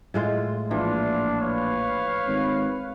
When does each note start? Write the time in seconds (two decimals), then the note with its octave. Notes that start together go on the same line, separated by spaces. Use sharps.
0.14 A2 G#3 F4
0.71 A#1 E3 D4 E4 F4
1.41 B4 C#5 F5
2.27 G#1